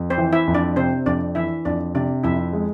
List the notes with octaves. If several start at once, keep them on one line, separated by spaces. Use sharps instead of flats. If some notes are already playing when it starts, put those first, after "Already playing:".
Already playing: F2
C4 C5
E3
E4 E5
F2
D4 D5
C3 C4 C5
F2 D4 D5
E3 E4 E5
F2 D4 D5
C3 D4 D5
F2 E4 E5
G#3